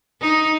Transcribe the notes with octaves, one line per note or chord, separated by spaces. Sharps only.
D#4